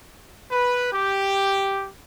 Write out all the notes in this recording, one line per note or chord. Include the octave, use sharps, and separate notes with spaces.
B4
G4